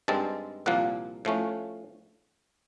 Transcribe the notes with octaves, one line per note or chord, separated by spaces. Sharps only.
G2 D#3 G#3 C4 A5
C2 A#2 F3 A#3 F#5
A2 F3 A3 C#4